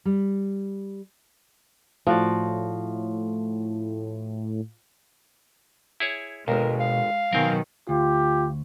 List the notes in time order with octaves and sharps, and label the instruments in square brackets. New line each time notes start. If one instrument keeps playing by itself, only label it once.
[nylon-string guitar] G3
[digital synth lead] A2 [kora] F3 F#4 D5
[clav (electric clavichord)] E4 G#4 C#5
[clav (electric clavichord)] G1 D#2 [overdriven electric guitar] B2 [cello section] G#3 [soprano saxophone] A#4
[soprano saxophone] F5
[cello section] B2 D#3 [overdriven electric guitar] F#3 G#5 [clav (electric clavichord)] C4 A#4
[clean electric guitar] D2 [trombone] F4 [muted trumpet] G4